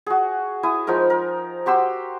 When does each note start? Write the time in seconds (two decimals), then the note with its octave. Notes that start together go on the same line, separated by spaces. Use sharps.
0.06 F#4 G#4
0.63 E4 G#5 D#6
0.87 F3 G#3 D#4 A#4
1.10 A#4
1.66 F#4 G4 C6 E6